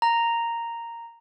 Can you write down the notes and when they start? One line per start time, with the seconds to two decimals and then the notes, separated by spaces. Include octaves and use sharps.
0.02 A#5